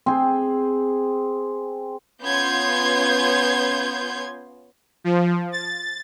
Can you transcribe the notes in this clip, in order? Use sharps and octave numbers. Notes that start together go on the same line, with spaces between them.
C4 G#4
B3 C#4 F4 C6 G6 G#6
F3
A6